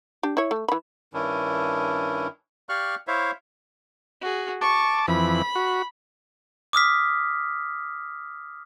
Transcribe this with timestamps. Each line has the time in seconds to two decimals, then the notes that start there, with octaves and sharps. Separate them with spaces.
0.23 D4 G4
0.37 E4 C#5
0.51 A3
0.68 E3 B5
1.14 G2 D#3 C#4 D4 E4
2.69 G4 D5 F5 C#6 F6 F#6
3.07 E4 C5 C#5 E5 F5
4.21 F#4 G#4
4.61 A5 C#6 D6
5.08 F2 E3 B5
5.55 F#4
6.73 D6 D#6 F6 B6